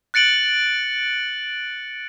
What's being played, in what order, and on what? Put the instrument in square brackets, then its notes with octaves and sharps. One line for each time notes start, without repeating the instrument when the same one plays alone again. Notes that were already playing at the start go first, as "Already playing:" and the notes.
[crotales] F#6 A6 C#7 D7 F#7